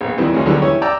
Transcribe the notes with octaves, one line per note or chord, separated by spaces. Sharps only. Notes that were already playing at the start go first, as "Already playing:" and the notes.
A#1 B3
F2 D#3 E3 G3 C4
D2 G#3 C#4
D3 D#3 G3 G#3 B3
C#4 E4 G4 C#5
D5 G5 A5 A#5 E6